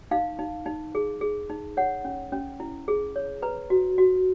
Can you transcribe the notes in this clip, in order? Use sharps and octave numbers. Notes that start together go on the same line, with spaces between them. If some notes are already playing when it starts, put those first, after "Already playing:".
D#4 F5
D#4
D#4
G#4
G#4
D#4
C#5 F#5
C#4
C#4
E4
G#4
C#5
B4 A#5
F#4
F#4